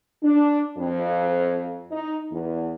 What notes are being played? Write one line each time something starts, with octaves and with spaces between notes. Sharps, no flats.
D4
F2
D#4
E2